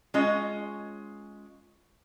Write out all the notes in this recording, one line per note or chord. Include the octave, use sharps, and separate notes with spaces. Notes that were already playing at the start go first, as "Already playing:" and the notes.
G#3 C#4 F4 D#5